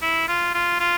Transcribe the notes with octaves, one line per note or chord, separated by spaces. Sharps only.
E4
F4
F4
F4